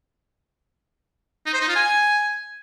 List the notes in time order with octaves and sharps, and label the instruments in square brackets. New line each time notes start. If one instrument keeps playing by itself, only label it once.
[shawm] D#4
C5
D#4
F4
G#5